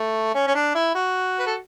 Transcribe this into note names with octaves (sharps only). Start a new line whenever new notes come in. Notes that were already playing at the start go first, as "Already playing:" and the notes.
Already playing: A3
C#4
C#4
D4
E4
F#4
B4
A4